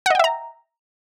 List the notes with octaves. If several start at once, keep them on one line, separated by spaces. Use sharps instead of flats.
D#5 E5 F#5 G5 A#5